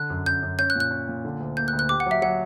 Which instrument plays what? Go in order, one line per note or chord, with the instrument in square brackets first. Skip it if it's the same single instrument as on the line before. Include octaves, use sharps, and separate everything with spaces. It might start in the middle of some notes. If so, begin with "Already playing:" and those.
Already playing: [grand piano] D3 [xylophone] F#6
[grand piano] F#2
[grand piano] F#2 [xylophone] G6
[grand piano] F#2
[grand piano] C#4 [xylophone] G6
[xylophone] F#6
[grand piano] A#2
[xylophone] F#6
[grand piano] C#4
A#2
D3
D2
[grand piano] A#3 [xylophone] G6
[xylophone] F#6
[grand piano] D2
[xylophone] F#6
[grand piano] G4 [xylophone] D6
[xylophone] F#5
[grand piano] F#3 [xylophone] E5
[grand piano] F#3 [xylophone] F#5